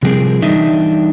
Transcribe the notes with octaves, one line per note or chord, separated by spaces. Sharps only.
C3 F3 G3 C4 G#4 A#4
E3 G3 D4 D#4 D#5 E5